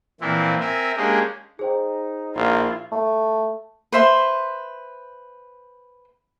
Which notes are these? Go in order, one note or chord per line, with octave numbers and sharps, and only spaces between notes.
A#2 E3 F3 C4 E4
C4 A#4 E5 G#5
G#3 A#3 C#4 D4 G4 G#4
D#4 G#4 C5 G5
A#1 E4 F4
A3
B4 C5 E5 C6